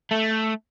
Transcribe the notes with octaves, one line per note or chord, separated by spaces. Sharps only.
A3